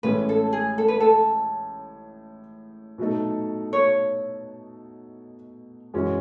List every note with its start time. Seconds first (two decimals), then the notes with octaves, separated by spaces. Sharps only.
0.03 A1 A2 G#3 C#4 B4
0.29 A4
0.53 G#4
0.78 A4
0.88 B4
1.00 A4
2.98 B2 F#3 A3 D#4 A4
3.73 C#5
5.94 F#2 E3 G#3 C#4 F#4